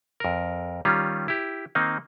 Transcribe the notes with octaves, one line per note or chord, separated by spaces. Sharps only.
F2 A#4
D#3 G3 C#4 F4
E4 G4
D#3 A#3 C4 D#4